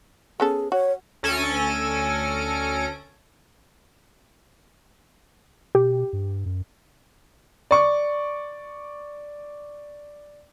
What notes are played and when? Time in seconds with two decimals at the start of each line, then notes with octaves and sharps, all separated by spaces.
0.40 B3 C#4 G#4 A4
0.72 F#4 C#5
1.23 D2 C#4 A4 G#5 A#6 D7
5.75 B2 G4
6.13 G2
6.46 F#2
7.71 D5 C#6